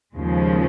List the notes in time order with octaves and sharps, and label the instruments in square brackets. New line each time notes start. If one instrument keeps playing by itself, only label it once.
[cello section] D#2 C#3 F3 G#3